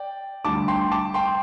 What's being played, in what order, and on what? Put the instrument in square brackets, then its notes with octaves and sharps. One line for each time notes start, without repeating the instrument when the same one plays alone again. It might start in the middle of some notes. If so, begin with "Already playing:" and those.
Already playing: [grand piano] D5 G5
D2 D3 G3 A5 D6
G5 C6
A5 D6
G5 C6